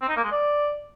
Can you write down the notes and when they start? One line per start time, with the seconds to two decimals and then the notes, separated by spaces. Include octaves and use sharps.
0.01 C4
0.09 D#4
0.16 A#3
0.24 G#3
0.31 D5